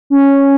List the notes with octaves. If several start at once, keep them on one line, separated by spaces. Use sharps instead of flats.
C#4